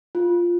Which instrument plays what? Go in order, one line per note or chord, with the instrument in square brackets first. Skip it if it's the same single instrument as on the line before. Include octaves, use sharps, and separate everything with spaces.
[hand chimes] F4